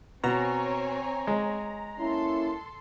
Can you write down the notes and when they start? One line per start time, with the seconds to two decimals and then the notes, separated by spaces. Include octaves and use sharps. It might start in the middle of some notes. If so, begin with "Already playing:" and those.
0.24 B2 C4 C#5 G#5 A#5
1.27 G#3
1.99 A#3 C#4 E4 A4 C6